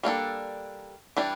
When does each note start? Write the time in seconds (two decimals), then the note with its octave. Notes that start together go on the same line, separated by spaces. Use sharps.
0.03 G3 A#3 D4 A4
1.17 E3 G3 D4